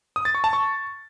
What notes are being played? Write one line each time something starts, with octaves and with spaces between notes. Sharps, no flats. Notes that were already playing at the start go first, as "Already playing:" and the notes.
D#6
A6
C#6
A5
C#6